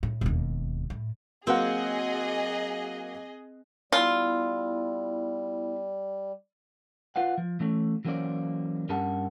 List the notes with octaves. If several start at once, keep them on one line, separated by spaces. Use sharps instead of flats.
A2
E1 D#2
A2
F#3 A#3 C4 G#4 D#5 F#5
G3 B3 E4 F4
F4 B4 F5 F#5
F3
E3 A3 C#4
E3 F#3 A#3 C#4 C5 D5
G2 C#4 G4 A#4 F#5 A5